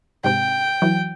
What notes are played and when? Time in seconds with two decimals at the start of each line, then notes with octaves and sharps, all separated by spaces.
0.24 G#2 C3 G5
0.82 E3 F#3